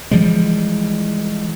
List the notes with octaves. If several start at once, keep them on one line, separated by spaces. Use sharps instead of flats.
E3 F3 G3 G#3